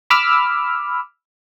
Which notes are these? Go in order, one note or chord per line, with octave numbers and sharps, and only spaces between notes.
B5 D6 E6 F6